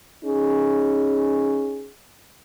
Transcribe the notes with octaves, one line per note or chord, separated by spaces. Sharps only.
C#4 D#4 G#4